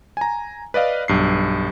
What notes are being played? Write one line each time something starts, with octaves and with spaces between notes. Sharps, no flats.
G#5 A#5
B4 D5 D#5 F5
B1 G2 C7